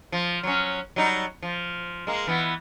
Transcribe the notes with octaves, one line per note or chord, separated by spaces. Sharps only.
F3
F#3 C#4
F#3 G3 D#4
F3
G#3 A#3
E3 B3